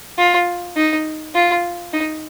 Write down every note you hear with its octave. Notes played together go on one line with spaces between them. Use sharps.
F4
D#4
F4
D#4